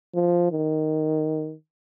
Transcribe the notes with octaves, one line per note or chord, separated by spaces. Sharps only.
F3
D#3